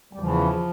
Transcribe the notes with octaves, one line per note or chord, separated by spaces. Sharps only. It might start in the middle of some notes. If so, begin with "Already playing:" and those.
G3
E2 C#3 E3 F3